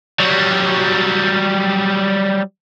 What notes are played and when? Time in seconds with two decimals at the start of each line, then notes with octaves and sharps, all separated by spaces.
0.20 F#3 G3